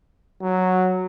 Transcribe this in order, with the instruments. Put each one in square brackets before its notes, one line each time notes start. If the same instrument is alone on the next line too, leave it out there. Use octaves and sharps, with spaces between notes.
[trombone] F#3